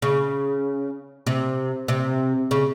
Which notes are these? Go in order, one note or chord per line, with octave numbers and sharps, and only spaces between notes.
C#3
C3
C3
C#3